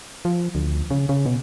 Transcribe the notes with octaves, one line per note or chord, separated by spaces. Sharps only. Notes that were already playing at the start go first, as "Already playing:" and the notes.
F3
D2
C#3
C#3
B2